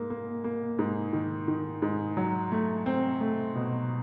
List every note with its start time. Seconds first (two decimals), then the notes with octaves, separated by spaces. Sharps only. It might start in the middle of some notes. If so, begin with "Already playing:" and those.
Already playing: G#2 A#3
0.10 A#3
0.44 A#3
0.79 G#2
1.13 D#3
1.48 D#3
1.82 G#2
2.17 F#3
2.52 A3
2.86 C4
3.21 A3
3.55 B2